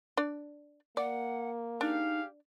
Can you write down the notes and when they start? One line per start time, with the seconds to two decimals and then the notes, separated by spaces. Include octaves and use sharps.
0.17 D4 D5
0.97 A#3 D5 F#5
1.81 D4 D#4 G4 G#4 F5